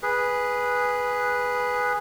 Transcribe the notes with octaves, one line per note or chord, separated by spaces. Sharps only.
G#4 B4